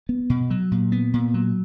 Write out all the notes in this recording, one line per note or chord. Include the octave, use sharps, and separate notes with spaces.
B3
B2
F#3
A#2
B3
A#2
F#3